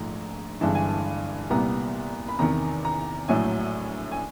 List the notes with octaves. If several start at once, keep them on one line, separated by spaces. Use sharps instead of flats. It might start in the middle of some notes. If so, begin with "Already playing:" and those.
Already playing: A#1 G#2 F3 A3 A#5
G1 G2 E3 G#3 A5
G#5
A5
C2 A#2 G3 B3 A#5
B5
E2 C3 D#3 A#5
A#5
A#1 A2 F#3 A3 G#5
G#5